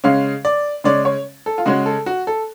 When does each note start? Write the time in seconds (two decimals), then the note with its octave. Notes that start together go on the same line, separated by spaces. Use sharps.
0.04 C#3 G#3 C#4 F5
0.45 D5
0.84 C#3 G#3 C#4 D5
1.05 C#5
1.46 A4
1.58 F4
1.66 C#3 G#3 C#4 F#4
1.86 A4
2.06 F#4
2.27 A4